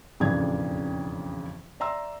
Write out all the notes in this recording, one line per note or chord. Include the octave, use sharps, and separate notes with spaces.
E1 A1 F2 C#3 D4 G#6
D5 E5 A#5 C6 E6